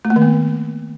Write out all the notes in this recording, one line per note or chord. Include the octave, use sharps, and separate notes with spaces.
A3
A#3
D#3
B3